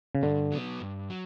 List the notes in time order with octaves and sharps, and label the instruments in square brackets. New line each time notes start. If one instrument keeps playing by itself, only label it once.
[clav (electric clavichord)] C#3
[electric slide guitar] G2 [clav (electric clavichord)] D3
[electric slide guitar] F#3 B3
G2
F#3